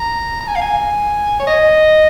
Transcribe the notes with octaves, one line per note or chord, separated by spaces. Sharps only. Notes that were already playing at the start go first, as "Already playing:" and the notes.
Already playing: A#5
A#5
G#5
F5
G#5
C#5
D#5